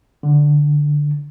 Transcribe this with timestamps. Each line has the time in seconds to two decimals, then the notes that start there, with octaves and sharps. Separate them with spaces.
0.23 D3